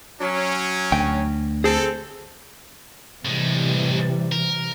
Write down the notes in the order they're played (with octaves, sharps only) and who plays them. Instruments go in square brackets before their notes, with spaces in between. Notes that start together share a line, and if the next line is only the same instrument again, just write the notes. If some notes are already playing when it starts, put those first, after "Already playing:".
[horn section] F#3 C#4
[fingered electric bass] D2 [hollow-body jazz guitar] G5
[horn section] C4 A4 [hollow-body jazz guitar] G#4
[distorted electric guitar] A2 G#3 [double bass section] C3 E3 G3
[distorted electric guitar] A#4